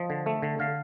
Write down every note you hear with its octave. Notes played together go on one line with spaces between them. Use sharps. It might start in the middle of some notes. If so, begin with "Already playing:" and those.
Already playing: F3 D#5
D3
A3
D3
D3 F5